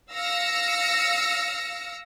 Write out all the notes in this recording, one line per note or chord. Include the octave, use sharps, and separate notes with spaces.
F5 E6 A#6 C#7